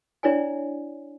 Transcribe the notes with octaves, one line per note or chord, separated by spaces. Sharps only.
D4 E4 C#5 D5 G#5